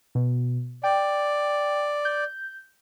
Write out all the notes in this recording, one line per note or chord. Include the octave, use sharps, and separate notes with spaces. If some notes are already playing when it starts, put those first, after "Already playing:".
B2
D5 G5
G6